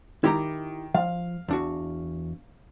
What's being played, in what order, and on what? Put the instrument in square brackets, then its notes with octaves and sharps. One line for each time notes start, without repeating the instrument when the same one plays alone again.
[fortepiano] D#3 [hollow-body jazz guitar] E4 G4 A#5
[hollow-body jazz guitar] F3 [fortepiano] F5
[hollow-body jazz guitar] E2 D4 F#4